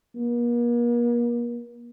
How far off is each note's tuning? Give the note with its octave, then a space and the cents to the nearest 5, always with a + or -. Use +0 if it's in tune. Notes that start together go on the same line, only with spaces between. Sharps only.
A#3 +40